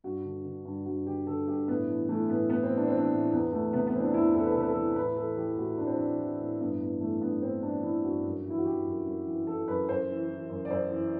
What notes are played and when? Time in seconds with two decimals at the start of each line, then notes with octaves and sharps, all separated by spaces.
0.04 G2 F#4
0.24 D3
0.44 D3
0.65 G2
0.86 G2 F#4
1.06 D3 G4
1.27 D3 A4
1.47 G2 G4
1.68 A2 B3
1.88 E3
2.09 E3 A3
2.29 A2 B3
2.49 A2 B3
2.63 C4
2.71 E3
2.77 D4
2.87 E3 C4
2.97 D4
3.12 A2
3.31 E2 B3
3.52 E2 A3
3.73 C3 B3
3.87 B3
3.93 E3 C4
4.00 D4
4.14 E2 E4
4.34 E2 A4
4.44 B4
4.52 C3 A4
4.60 B4
4.70 A4
4.76 E3
4.96 A2 B4
5.16 E3 A4
5.37 E3 G4
5.58 A2 F#4
5.78 A2 D4
5.87 C4
5.95 E3 D4
6.19 E3
6.40 A2
6.60 G2 B3
6.80 E3 B3
7.01 E3 A3
7.21 G2 B3
7.42 G2 C4
7.63 E3 D4
7.83 E3 E4
8.04 G2 F#4
8.24 F#2
8.45 E3
8.50 E4
8.58 F#4
8.65 E3 G4
8.85 F#2
9.06 F#2
9.27 E3
9.47 E3 A4
9.68 F#2 B4
9.88 F#2 C5
10.09 E3
10.29 E3
10.50 F#2
10.65 D5
10.70 F#2 C5
10.91 E3